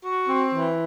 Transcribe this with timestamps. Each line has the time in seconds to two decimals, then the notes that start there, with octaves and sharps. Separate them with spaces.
0.03 F#4
0.29 C4
0.54 E3